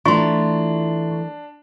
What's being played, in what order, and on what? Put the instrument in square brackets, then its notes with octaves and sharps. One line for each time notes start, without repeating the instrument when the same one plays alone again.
[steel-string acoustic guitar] E3 A3 [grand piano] D4 [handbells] F4 C6 [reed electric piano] C#6